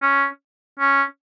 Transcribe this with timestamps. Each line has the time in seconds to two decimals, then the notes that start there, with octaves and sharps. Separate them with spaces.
0.02 C#4
0.80 C#4